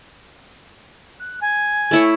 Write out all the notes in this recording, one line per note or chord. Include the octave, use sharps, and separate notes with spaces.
F#6
G#5
A3 E4 C#5